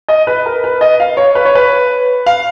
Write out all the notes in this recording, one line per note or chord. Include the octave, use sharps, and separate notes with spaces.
D#5
B4
A#4
B4
D#5
F5
C#5
B4
C#5
B4
F5